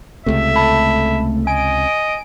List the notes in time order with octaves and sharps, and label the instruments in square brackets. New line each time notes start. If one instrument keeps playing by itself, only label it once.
[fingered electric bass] C#2 C3 [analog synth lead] A3 [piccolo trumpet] E5
[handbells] A5 B5
[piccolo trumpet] D#5 [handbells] G#5 [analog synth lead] D7